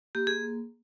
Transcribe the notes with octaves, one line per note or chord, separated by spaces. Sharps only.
A#3 G4
A#3 G#4